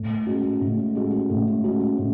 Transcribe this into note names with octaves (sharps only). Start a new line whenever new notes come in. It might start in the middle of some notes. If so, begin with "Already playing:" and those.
Already playing: A2
G#3 C#4 F#4
A2
G#3 C#4 F#4
A2
G#3 C#4 F#4
A2